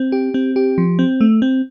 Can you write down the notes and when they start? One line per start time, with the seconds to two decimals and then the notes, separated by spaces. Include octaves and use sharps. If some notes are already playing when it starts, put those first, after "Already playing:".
Already playing: C4
0.12 G4
0.34 C4
0.56 G4
0.78 F3
0.99 C4
1.21 A3
1.42 C4